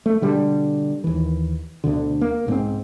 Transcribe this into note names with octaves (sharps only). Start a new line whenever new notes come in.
A3
B2 D3 G3
D#2 E3
D2 B2 D3
A#3
B1 G#2 F#3 C4